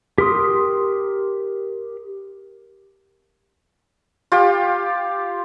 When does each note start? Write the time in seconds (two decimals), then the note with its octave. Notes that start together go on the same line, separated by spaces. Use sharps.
0.18 G4 A#4 C6 D#6
4.32 F4 G4